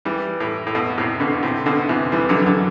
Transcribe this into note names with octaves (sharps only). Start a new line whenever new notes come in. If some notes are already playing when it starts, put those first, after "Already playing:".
E3 G3
A2
A2
B2
A2 C3
B2 D3
A2 C3
B2 D3
C3 E3
E3 G3
D3 F#3
D3 F#3